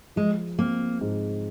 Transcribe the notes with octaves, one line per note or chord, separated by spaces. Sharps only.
F3 G#3
A#3 C4
G#2